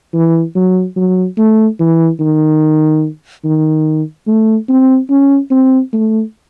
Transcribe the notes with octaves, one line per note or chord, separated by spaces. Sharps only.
E3
F#3
F#3
A3
E3
D#3
D#3
A3
C4
C#4
C4
A3